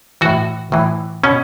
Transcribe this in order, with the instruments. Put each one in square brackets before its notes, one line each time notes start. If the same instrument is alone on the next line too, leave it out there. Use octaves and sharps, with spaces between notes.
[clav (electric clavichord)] A2 E3 F#4
A2 E3
B2 C#4